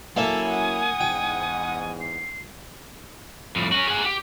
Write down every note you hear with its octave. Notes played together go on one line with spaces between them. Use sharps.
F#3 A#3 C#4 E4 A4 E5 G#5
F#5 D#6
E2 G#2 G5
C7
F2 A2
C#4 F#4
G#4 F#5
G4